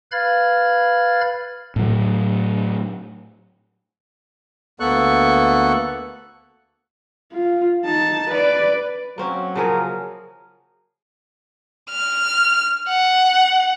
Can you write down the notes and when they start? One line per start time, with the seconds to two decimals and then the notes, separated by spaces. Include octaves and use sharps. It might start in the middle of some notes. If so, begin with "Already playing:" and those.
0.12 B4 F5 B5 F6 G#6 A6
1.76 A2 F#3
4.80 D2 A#3 B3 A4 C#6 F#6
7.33 F4
7.85 D#4 A5
8.31 B4 D5
9.18 F#3 A#3 C4 C#4
9.55 C#3 F3 G#4 A#4
11.90 F6
12.88 F#5